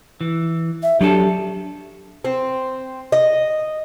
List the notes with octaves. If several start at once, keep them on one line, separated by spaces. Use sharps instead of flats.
E3
E5
F#3 D4 G4 A4 A5
C4
D#5